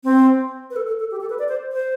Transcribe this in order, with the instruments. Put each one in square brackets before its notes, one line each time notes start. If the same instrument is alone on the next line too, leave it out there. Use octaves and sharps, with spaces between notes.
[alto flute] C4
B4
A4
A4
A4
G4
A4
B4
D5
C5
C5